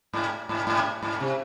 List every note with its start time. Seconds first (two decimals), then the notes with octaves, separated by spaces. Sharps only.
0.13 G#2
0.49 G#2
0.67 G#2
1.02 G#2
1.20 C3